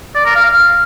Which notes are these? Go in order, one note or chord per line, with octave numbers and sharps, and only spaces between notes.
D5
A#4
F5
F5